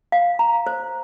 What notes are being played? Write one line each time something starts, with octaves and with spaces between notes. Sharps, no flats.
F5
A#5
C5